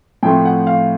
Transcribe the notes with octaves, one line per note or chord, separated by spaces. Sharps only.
A2 F3 A3 C4 G5
F#5
F5